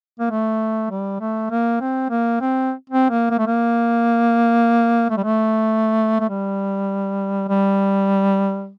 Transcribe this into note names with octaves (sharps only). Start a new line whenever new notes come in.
A#3
A3
G3
A3
A#3
C4
A#3
C4
C4
A#3
A#3
A3
A#3
A3
G3
A3
A3
G3
G3